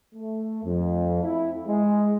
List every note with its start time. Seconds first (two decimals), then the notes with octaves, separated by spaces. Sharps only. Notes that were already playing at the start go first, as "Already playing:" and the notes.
0.15 A3
0.64 F2
1.22 E4
1.68 G#3